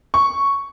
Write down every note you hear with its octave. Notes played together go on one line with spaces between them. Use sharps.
C#6